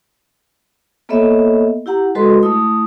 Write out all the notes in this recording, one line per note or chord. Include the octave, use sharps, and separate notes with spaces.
A#3 B3 A4 C#5 D#5 E5
E4 G4 F#5 A#5
G#3 F#4 A4 B4 D#5 C6
A3 E4 D#6